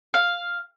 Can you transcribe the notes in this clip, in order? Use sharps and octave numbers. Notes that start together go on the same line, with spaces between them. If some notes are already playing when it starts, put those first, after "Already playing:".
F5